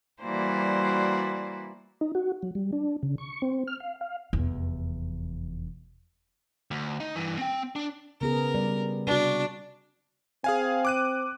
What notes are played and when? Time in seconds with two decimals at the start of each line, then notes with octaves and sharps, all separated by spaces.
0.22 E3 G3 A#3 F#4 C5 D5
2.01 D#4
2.15 F#4
2.43 F#3
2.55 G3
2.72 D4
3.03 C#3
3.18 C#6
3.42 C4
3.68 F6
3.80 F5
4.01 F5
4.33 F1 E2
6.71 D2
7.00 D#4
7.16 G2 E3
7.39 C4 G5
7.76 D4
8.21 C#3 B3 G#4 A#4
8.54 G3 D5
9.07 C3 D4 F#4
10.44 C4 G#4 F5 G#5
10.85 D6 F#6 D#7